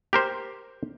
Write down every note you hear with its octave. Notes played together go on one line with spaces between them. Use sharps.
G4 A#4 C5